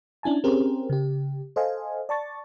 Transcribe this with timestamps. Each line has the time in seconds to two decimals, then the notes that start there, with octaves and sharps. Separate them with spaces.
0.23 C#4 D4 E4 G#5 A5
0.44 C4 C#4 G4 G#4 A#4 C5
0.90 C#3 G4
1.56 A4 C5 D#5 F5 G#5
2.09 D5 A5 C#6 A6